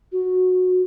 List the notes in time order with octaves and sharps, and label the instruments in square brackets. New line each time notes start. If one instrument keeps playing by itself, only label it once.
[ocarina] F#4